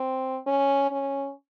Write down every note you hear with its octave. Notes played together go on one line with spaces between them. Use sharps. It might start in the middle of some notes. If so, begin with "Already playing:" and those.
Already playing: C4
C#4
C#4